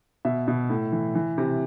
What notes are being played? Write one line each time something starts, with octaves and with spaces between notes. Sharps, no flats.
B2 E5
B2
A2
E3
E3
C3